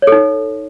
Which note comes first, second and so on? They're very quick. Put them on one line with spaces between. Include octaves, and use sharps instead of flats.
C#5 A4 D#4